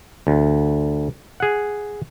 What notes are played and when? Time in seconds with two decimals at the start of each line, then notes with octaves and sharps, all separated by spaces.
0.27 D2
1.40 G#4 F#5